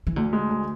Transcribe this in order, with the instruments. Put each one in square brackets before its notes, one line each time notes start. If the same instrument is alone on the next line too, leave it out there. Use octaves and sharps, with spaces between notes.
[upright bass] E3
[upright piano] D2 [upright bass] D3
[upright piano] G#3
D2